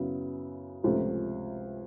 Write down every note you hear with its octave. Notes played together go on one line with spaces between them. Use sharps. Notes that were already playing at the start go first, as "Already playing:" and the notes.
Already playing: F#2 C#3 F#3 B3 E4
C#2 C3 F3 A3